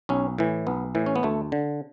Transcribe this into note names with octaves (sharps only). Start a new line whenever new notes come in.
B1 C#4
A2 E3
B1 B3
A2 E3
C#4
B3
D2 A3
D3